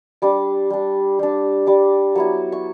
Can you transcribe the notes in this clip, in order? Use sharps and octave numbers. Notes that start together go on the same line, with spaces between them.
G3 D4 D6
G3 D4
G3 D4
G3 D4 D6
F#3 B3 E4 C#6
C#6